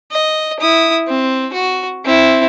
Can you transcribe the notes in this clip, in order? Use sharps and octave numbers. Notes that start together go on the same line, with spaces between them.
D#5
E4 D#6
C4
F#4
C4 E4